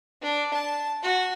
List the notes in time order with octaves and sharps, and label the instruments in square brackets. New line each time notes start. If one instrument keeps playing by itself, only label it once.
[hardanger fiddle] D4
A5
F#4